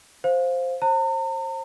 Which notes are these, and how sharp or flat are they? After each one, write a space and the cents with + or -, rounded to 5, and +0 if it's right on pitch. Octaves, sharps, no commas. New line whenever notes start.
C5 +0 F5 +10
C5 +30 A#5 -45